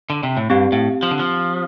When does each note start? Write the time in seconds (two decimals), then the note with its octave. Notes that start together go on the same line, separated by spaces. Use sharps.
0.10 D3
0.23 C3
0.37 A2
0.50 G2 C4 G4 F5
0.72 A2
1.03 F3
1.11 D3
1.19 F3